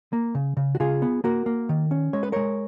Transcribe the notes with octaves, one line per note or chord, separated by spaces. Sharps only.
A#3
C#3
C#3
F#4
C#3 F4 G#4
B3
A#3 F#4 A#4
A#3
D#3
C#4
G#3 C#5
B4
G#3 A#4 C#5